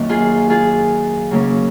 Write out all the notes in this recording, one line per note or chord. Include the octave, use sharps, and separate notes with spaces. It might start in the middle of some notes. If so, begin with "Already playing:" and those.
Already playing: F#2 D#3 A#3 C#4
F4 G#4
F4 G#4
C#3 F#3 A#3 C#4